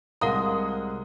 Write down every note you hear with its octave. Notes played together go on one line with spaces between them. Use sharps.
C2 G#3 A#4 F5 F#5 A#5 D#6